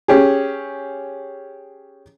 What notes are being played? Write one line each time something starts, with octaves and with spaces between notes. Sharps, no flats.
C#4 G4 G#4